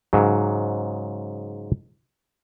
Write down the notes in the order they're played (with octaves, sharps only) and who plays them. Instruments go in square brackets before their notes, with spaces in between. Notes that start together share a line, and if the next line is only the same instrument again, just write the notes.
[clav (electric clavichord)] G#2 C#3 F#3